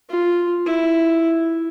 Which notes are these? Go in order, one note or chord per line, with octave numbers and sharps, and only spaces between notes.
F4
E4